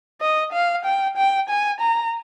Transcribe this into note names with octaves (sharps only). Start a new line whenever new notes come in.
D#5
F5
G5
G5
G#5
A#5